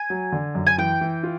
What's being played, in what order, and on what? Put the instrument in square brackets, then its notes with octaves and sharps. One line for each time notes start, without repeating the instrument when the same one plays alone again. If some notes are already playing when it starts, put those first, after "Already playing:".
Already playing: [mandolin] G#5
[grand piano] F#3
D3
F#2
[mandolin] G#5
[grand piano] E3 [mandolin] G5
[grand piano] E3
F4